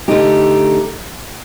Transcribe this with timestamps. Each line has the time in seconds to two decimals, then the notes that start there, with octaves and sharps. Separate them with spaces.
0.08 D3 A3 D#4 G4